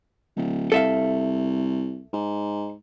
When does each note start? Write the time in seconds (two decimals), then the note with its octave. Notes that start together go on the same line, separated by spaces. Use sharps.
0.36 D1
0.72 C2 A4 E5 F5
2.13 G#2